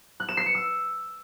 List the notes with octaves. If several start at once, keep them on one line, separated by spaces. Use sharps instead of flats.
F#6
E7
C7
C#7
E6